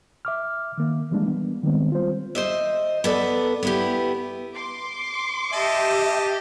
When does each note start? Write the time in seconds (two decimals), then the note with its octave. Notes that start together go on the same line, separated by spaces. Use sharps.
0.25 E5 D6 F6
0.78 D#3 A#3
1.11 E3 G3 G#3 A#3 D4
1.26 B3
1.63 D#3 G3 G#3 B3 C4
1.92 F4 C5
2.35 C5 D#5 E5
3.04 B3 A4 D5
3.63 B3 E4 G4
4.54 C6 D6
5.53 G4 D#5 E5 A5